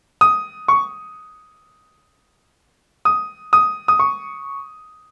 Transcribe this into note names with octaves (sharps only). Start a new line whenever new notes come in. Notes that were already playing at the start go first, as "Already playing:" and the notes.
D#6
C#6
D#6
D#6
D#6
C#6